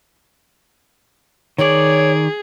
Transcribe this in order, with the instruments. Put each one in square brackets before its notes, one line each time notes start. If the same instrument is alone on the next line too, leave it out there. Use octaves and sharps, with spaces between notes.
[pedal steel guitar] D#3 D5 [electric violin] G#4 [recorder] C#5